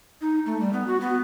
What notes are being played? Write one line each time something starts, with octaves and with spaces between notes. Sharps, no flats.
D#4
A3
G3
B3
F#4
B3